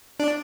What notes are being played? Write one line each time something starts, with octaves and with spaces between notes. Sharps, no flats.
D4 D5